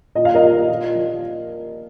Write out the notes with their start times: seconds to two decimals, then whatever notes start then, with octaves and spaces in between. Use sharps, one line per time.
0.15 A#2 D#5
0.25 F5
0.34 A#4 D#5
0.42 A#2
0.68 F3
0.95 F3